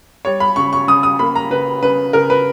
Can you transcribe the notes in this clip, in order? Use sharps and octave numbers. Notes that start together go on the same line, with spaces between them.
G3 C#5
B5
C#3 C#6
C#6
C#3 D#6
D#6
A#3 B5
A#5
C#3 B4
C#3 B4
C#3 A#4
B4